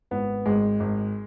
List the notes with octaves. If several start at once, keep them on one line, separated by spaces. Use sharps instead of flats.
G#1 B3
G#1 G#3
G#1